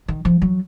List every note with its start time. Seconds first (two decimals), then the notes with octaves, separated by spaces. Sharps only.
0.08 D#3
0.25 F3
0.42 F#3